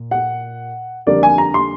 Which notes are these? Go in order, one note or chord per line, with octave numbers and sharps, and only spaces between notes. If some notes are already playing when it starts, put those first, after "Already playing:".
Already playing: A#2
F#5
F2 D3 G3 A#3 D5
G#5
A#5
C6